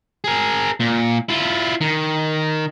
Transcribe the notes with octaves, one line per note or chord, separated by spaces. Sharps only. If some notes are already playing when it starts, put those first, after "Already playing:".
G#4 A#4
A#2
E4 F4
D#3